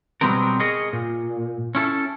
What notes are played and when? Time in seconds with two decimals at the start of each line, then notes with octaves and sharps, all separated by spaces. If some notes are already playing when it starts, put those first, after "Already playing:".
0.21 B2 F#3 G3 B3 C4 A#4
0.60 G#4 A#4 C#5 D#5
0.93 A#2
1.75 C#4 E4 A4